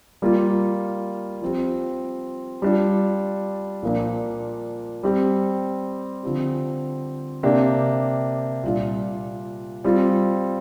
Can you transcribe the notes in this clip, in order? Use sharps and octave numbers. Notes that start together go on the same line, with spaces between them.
G3 A#3 F4
F3 C4 G4
G3 D4 F4
A#2 F3 A#3 D4
G3 C4 G4
D3 F3 C4 G4
C3 A#3 D4 G4
A#2 G3 D4 F4
G3 C4 F4